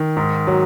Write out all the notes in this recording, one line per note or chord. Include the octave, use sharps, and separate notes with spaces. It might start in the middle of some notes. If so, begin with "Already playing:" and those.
Already playing: D#3
G#2
F#3